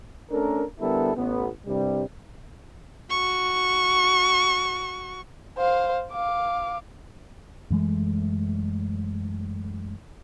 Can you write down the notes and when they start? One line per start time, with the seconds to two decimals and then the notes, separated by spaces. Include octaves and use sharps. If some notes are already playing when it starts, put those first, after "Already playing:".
0.30 A3 C#4 D4 A4 A#4
0.80 D3 G3 B3 E4 A4 A#4
1.16 A1 B3
1.66 C2 G2 C3 G3
3.10 F#4 C#6
5.57 C5 F5
6.12 F5 D6
7.70 F#2 E3 G#3 A3